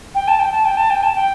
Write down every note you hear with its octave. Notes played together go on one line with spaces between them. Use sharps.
G5
A5
G5
A5
G5
A5
G5
A5
G5